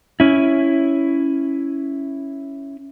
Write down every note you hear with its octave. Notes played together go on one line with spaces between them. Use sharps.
C#4 E4